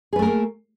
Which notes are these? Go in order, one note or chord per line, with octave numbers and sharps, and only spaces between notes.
A3 A#3 G#4 A#4 B4